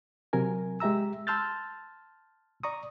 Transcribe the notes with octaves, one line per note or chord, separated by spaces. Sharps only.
C3 F#3 A#4 G#5
G#3 G4 E5 A#5 E6
A5 C6 E6 F6 G6 A6
D5 A#5 C#6 D#6